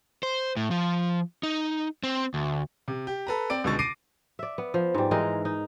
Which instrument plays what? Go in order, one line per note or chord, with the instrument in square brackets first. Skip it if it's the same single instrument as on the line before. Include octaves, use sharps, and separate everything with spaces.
[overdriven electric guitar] C5
A2
F3
D#4
C4
D2
[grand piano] C3
G4
A4 B4 A#5
C4 D5 D7
C#2 B2 D3 G#3 C#6 A6
D6 A#6 C7 D7 D#7
[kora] D5 E5
B3
F3
G#2 G3
E3 G#3 D#4 A#4
D#4